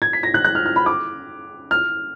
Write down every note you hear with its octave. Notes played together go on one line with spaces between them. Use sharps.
G#6
B6
A#6
F#6
F#6
F6
F6
B5
D6
F6